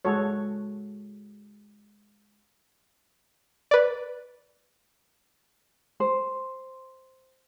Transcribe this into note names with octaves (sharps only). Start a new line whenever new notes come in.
G#3 F#4 A4 C#5
B4 D5
C5